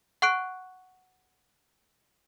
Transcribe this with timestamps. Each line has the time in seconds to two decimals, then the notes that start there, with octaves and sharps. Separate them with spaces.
0.22 F#5 C#6 F#6 D7